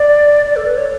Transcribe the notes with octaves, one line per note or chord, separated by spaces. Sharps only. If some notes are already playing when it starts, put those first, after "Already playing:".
Already playing: D5
D5
A4
B4
C#5